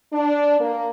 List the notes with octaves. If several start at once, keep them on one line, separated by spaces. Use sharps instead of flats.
D4
A#3